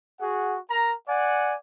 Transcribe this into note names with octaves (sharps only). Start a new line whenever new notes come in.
F#4 G#4 F#5
A#4 A#5
D5 F#5 G#5